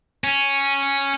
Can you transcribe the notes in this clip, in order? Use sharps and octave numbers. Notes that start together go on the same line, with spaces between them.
C#4